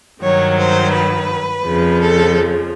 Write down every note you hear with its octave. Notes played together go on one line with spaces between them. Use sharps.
G2 D#3 F#3 C#5
C5
B4
F2 C#3 F3
A4